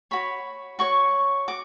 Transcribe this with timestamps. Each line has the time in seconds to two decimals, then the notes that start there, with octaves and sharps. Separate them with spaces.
0.11 F#4 C#5 B5
0.79 F#4 C#5 C#6
1.48 F#4 D6